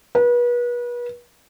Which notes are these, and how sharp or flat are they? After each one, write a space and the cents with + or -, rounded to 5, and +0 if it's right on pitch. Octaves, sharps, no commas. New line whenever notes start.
B4 -35